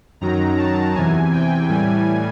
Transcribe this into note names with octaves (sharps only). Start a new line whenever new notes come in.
F#2 D#3 F#3 A#5
A5
E2 C3 E3 G#5
G5
A2 E3 G3 G#5